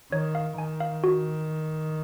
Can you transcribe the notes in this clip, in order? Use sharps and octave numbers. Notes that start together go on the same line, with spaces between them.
D#3 C#5
F5
D#3 G#5
F5
F#4